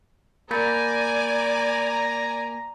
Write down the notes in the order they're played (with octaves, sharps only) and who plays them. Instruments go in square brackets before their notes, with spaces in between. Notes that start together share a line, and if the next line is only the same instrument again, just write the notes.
[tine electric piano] A#3 [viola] D5 G#5 [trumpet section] A#5 [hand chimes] B5 G6 A6